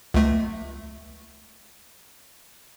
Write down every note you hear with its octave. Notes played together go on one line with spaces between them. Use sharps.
C#2 A3